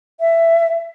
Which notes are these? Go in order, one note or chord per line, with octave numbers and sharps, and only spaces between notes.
E5